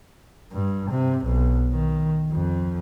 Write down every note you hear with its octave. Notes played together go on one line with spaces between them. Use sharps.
G2
C3
B1
D#3
F2